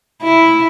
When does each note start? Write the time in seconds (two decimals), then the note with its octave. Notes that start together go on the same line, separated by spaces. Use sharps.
0.23 E4